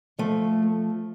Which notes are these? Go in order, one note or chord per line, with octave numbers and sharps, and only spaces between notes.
F3 A3